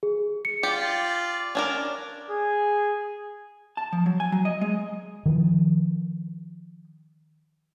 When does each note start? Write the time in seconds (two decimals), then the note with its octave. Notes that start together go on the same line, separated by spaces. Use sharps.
0.03 G#4
0.45 C#7
0.63 F4 G4 D5
1.55 C#4 D4 A#4
2.30 G#4
3.77 A5
3.93 F3
4.06 F#3
4.20 G#5
4.32 F#3
4.45 D#5
4.61 G#3
5.26 D#3 F3